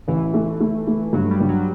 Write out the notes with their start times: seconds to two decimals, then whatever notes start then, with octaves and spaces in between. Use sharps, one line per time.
0.08 A1 E3
0.34 A3
0.60 A3
0.87 A3
1.13 G2 F#3
1.31 G3
1.40 G2
1.49 F#3